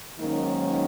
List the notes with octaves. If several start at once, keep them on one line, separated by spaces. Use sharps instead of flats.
G#2 D#3 F#3 A#3 C#4 D#4